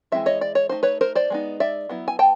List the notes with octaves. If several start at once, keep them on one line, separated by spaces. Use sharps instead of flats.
E3 G#3 C4 E4 E5
C#5 D#5
D5
C#5
A3 C4 D#4 C5
B4 C#5
A#4 C5
C5 D5
G#3 B3 D#4
D5 E5
F#3 B3 E4
G#5
G5 A5